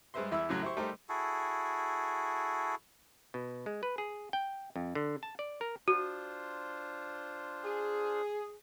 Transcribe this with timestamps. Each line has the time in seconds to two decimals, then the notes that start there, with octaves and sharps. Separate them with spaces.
0.14 G2 G#3 B4 C5 E5 C6
0.31 E2 E4 E5 B5 E6
0.49 F#2 A2 C#3 F#3
0.63 E4 G4 C5 C6 C#6
0.77 G3 A3 D#4 G4 A#4 C5
1.09 E4 F#4 G#4 A4
3.34 B2
3.66 G#3
3.83 B4
3.98 G#4
4.33 G5
4.76 F2
4.95 D3
5.23 A5
5.39 D5
5.61 A#4
5.88 D4 F4 F#4 C5
7.64 G#4